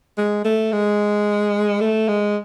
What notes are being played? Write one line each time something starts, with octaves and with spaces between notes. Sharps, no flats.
G#3
A3
G#3
A3
G#3